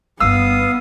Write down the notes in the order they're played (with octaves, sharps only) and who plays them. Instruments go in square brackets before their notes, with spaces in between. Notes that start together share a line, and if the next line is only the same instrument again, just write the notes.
[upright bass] G1 G2 [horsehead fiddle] B3 [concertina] F5 D#6 [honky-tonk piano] E6